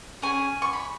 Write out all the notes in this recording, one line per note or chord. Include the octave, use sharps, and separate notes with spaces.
C#4 G#4 G#5
C#6
B5